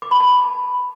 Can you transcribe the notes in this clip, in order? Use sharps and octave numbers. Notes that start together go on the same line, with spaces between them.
D6
B5
A5